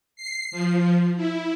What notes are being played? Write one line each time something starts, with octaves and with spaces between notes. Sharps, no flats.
C7
F3
E4